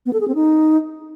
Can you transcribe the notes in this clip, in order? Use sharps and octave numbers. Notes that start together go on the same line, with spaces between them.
B3
A4
G#4
C4
D#4